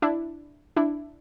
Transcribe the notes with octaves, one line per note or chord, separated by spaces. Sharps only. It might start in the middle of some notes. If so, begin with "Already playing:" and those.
D4 E4
D4 E4